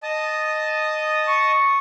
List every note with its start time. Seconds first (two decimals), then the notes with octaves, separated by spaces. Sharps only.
0.03 D#5 A5 D#6
1.28 C#6